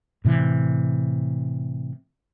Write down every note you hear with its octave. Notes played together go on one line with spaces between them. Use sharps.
A2 C3 E3